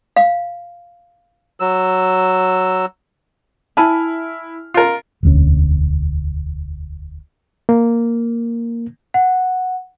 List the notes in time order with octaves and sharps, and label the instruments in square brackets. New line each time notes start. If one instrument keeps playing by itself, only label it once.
[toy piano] F5
[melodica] F#3 E6
[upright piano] E4 F6 [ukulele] G#5 A5 B5
[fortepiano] F4 A#4
[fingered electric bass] E1 D2 C#4
[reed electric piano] A#3
[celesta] F#5